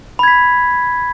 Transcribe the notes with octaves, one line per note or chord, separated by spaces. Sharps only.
B5 G#6 B6